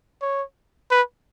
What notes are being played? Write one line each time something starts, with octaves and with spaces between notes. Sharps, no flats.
C#5
B4